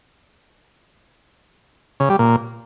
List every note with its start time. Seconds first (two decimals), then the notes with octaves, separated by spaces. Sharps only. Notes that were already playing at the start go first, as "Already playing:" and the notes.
2.00 C#3
2.10 G3
2.19 A#2